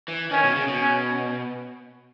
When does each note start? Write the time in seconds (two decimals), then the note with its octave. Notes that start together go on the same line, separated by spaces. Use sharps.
0.08 E3
0.31 D#3 C#4
0.44 B2
0.56 C#3
0.68 B2
0.80 C#4